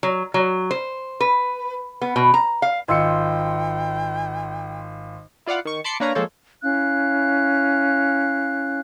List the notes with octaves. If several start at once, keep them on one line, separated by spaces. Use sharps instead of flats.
F#3
F#3
C5
B4
B3
B2
A#5
F5
G#1 F4 D#5 G5 C6 E6 C#7
E4 F4 D5 F5 F#5
D#3 C#6
A5 B5 C6 D6 C7 C#7
A#3 D4 B4 C#5 F5 A#5
F3 G#3 A#3 A4 C5 C#5
C#4 E4 F5 F#6